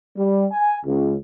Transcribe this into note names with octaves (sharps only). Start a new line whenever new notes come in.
G3
G#5
C#2